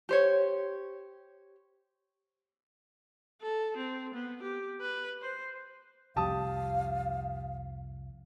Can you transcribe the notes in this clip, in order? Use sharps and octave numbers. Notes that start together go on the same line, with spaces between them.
G4 C5 C#5
A4
C4
B3
G4
B4
C5
C2 F2 G4 F5 A5 D#6